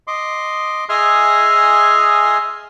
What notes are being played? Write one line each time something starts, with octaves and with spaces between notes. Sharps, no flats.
D#5 C6 D6
G#4 D#5 E5 G#5 C6 F6